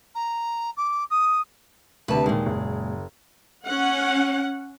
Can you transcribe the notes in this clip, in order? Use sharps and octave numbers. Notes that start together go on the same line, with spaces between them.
A#5
D6
D#6
D2 C3 B4 A5
D#2 A#2 G#3
F#1
C#4 F#5